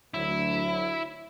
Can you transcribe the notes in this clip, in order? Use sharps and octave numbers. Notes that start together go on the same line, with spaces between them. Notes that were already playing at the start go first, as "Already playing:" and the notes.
D2 F#3 E4